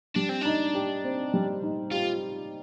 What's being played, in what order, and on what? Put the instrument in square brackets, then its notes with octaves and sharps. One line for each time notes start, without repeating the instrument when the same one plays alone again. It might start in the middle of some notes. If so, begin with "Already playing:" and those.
[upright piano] G3 [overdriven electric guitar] D4
[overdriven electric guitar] C4
[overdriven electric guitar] D4 [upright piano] D#4
[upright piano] G4
C4
G3
D#4
[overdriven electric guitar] F4 [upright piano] G4